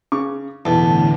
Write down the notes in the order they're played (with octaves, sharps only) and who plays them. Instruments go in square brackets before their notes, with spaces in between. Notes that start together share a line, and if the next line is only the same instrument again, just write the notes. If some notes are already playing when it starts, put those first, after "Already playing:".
[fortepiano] C#3 C#6 D6
[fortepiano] B1 [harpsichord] E2 [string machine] A2 D3 [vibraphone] A5